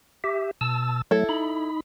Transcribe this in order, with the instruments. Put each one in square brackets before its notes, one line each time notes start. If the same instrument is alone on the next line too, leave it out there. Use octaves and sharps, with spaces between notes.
[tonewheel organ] G4 E5
B2 A5 E6
[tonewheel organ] F#3 A3 [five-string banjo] E4 A4
[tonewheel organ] D#4 B5